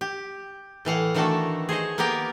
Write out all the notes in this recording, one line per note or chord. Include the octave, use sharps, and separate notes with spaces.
G4
A2 E3 F5 F#5
D#3 E3 A3 D4 F#4 A4
G#4 C5 C#5 D#5
A#3 B3 G4 A#4 G5